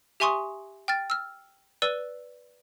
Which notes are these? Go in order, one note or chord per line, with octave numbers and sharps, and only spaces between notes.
G4 E5 G#5 C6 C#6 D#6
G5 F6 A6
E6 F6
B4 D5 E6 D#7 G7